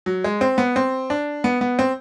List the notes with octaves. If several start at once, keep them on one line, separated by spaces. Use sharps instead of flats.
F#3
G#3
C4
B3
C4
D4
B3
B3
C4